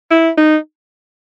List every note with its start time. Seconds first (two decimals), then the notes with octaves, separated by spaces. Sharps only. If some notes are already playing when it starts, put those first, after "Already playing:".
0.11 E4
0.37 D#4